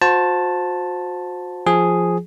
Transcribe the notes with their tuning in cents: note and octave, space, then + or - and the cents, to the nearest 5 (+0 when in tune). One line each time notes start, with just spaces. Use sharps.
F#4 -40 C5 +0 A5 +0
F3 +0 G#4 +0